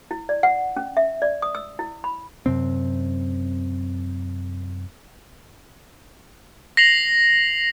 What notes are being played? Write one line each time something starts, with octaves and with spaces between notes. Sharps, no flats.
E4
D5
F#5
C#4
E5
D5
D#6
E6
E4
B5
F#2 C3 C4
A#6 C7 F7 F#7